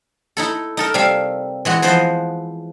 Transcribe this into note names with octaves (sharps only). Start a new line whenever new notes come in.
D#4 E4 A4
D#4 A4 A#4
C3 G3 E5 F5
E3 G#3 F#4
E3 F3 B3 C5 D#5